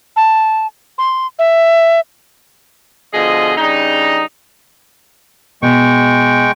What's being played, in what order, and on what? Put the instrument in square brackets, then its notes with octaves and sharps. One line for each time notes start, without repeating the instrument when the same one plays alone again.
[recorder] A5
C6
E5
[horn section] B2 D3 F3 G#4 D#5
C#3 G3 D4 D#4
[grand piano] B2 [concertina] G#3 G5 C#6